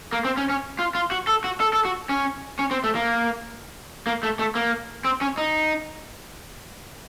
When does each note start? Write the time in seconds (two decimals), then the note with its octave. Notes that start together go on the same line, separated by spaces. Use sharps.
0.13 A#3
0.25 C4
0.37 C#4
0.50 C#4
0.79 F4
0.95 F4
1.11 F#4
1.27 A4
1.44 F#4
1.60 A4
1.73 A4
1.85 F#4
2.09 C#4
2.59 C#4
2.71 C4
2.84 A3
2.95 A#3
4.07 A#3
4.23 A3
4.39 A3
4.55 A#3
5.05 C4
5.21 C#4
5.38 D#4